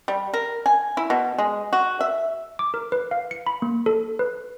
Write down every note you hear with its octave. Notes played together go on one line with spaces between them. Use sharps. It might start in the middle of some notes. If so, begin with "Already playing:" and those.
G3
A#4
G#5
E4
B2
G#3
F#4
E5
D6
A#4
B4
F5
C#7
B5
A#3
A4
B4